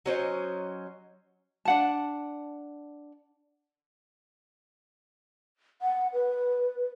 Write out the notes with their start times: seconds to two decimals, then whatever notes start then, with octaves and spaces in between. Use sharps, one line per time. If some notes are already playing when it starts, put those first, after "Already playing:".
0.06 F#3 C#4 C5 D#5
1.65 D4 F#5 A5
5.82 F#5
6.13 B4